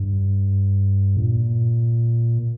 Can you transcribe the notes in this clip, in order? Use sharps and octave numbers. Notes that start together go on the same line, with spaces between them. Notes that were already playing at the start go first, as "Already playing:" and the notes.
Already playing: G2
A#2